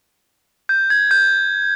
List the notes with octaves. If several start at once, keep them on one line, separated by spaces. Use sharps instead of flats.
G6
G#6
G6